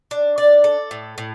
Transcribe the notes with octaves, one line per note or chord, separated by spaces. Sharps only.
D4
D5
A4
A2
A2